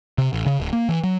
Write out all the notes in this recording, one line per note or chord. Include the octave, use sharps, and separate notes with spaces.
C3
A1
C#3
D1
A#3
E3
F#3